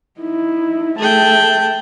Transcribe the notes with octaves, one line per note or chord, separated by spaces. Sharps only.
D#4 E4
A3 G#4 G5 A5